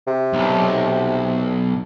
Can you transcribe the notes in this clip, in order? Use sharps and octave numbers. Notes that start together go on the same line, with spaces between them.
C3
B1